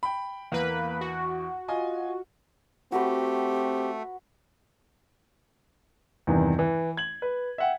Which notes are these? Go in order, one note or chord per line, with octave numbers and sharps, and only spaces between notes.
G5 B5
E2 A#3 B4 B5
F#4
F4 D#5 G#5
A3 C4 F#4 G4 B4
E2 G2 C3 D#3 E3
E3
G#6 F#7
B4
E5 F#5 G5